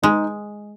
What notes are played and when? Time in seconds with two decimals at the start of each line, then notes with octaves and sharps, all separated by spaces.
0.03 G#3 D#4